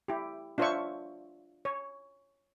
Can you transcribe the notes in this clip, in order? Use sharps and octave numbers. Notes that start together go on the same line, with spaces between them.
E4 G4
D4 F4 C5 C#5 E5 C#6
C#5